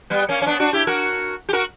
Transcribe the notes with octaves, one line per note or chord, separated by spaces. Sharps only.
G3 B3
A#3 C#4
C#4
B3 D4
D4 F#4
E4 G4
F#4 A#4
G4
F#4 A#4